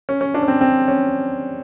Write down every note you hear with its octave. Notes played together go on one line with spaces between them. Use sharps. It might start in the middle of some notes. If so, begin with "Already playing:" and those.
C#4
C#4
D4
C#4
C4
C4
C#4